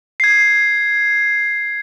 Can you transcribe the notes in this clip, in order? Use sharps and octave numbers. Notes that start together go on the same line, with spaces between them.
G#6 C7